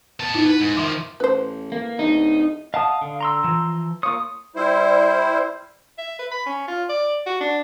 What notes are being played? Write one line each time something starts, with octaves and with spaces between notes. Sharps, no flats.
B3 A5
D#4 E4
B4
G#2
D#3 F3 E5 C6 D6
A1 B4 C5
A#3
D1 D#4
D#5 F5 F#5 A5 D#6
D3
A#5 C6 E6
E3 F3
A#3 F4 C#5 D#6
G3 E4 C5
E5
B4
B5
C#4
F4
D5
F#4
D4